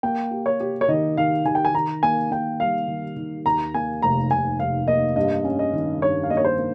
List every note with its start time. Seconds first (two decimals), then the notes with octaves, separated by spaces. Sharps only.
0.03 A#3 G5
0.31 G4
0.46 C#5
0.60 G4
0.81 C#5
0.88 D#3 D#5
1.17 D#3 F5
1.45 D#3 G#5
1.55 G5
1.65 G#5
1.74 D#3 A#5
2.03 A#3 G#5
2.31 A#3 G5
2.60 G3 F5
2.88 D#3
3.16 D#3
3.46 D#2 A#5
3.74 A#3 G#5
4.02 F1 A#5
4.30 F1 G#5
4.59 F1 F5
4.87 A#3 D#5
5.16 G2 D#5
5.45 C#4
5.59 D#5
5.73 D#3
6.01 G2 C#5
6.23 F5
6.30 A#3 D#5
6.37 C#5
6.45 C5
6.58 A#3